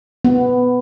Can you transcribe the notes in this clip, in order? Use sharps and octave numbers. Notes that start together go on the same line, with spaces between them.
B3